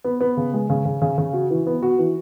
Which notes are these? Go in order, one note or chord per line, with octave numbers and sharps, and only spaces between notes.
B3
B3
C#3
G#3
C#3
C#3
C#3
C#3
F#4
E3
B3
F#4
E3